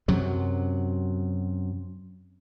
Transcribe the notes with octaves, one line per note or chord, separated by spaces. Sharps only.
F#2 C3 F#3